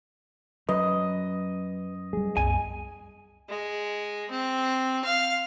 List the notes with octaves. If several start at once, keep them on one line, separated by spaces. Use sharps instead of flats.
F#2 F#3 B4 D#5
G3 G#3 G#4
C2 F#2 B3 G#5
G#3
C4
F5